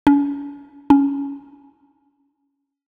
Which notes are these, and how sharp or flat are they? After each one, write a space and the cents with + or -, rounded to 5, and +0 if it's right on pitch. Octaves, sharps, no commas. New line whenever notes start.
C#4 +40
C#4 +15